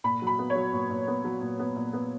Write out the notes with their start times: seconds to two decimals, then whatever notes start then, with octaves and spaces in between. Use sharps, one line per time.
0.04 A#2 B5
0.22 F#3
0.27 B5
0.38 B3
0.50 C#5
0.55 F#3
0.73 A#2
0.90 A#2
1.07 B3
1.24 F#3
1.41 A#2
1.59 B3
1.76 A#2
1.93 B3